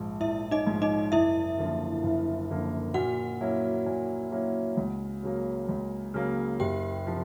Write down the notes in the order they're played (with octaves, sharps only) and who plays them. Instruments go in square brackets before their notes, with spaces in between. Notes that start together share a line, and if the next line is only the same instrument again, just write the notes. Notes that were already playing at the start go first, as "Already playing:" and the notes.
Already playing: [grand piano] A#1 G#2 F3
[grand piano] A#1 [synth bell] E4 E5
[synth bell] D#4 D#5
[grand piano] G#2 F3
[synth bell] D#4 D#5
[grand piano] F#1 [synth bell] E4 E5
[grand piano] F#2 D3 F3 A#3
F#1
F#2 D3 F3 A#3
[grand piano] A#2 [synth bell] F#4 F#5
[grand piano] F#3 A#3 C#4 E4
A#2
F#3 A#3 C#4 E4
C#2
C#3 F#3 A#3
C#2
C#3 F#3 A#3
[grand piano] F#1 [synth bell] G4 G5
[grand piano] C3 F3